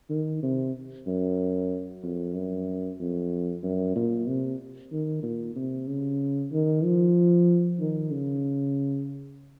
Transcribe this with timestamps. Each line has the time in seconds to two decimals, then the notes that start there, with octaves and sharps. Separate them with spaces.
0.10 D#3
0.43 C3
1.07 F#2
2.03 F2
2.35 F#2
3.00 F2
3.63 F#2
3.96 A#2
4.27 C3
4.92 D#3
5.23 A#2
5.56 C3
5.88 C#3
6.52 D#3
6.84 F3
7.80 D#3
8.12 C#3